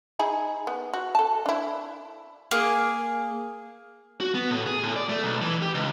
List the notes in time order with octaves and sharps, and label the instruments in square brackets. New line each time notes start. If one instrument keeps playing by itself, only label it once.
[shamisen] D#4 E4 G#4
B3
F#4
A4 A5
D4 E4
[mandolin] A#3 G#4
[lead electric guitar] F#4
B3
A2
G#4
A2
D5
A3
B1
E3
G4
C#2